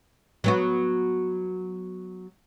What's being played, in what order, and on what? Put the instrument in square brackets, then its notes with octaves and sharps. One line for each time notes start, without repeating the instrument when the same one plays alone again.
[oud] F#3 B3 F#4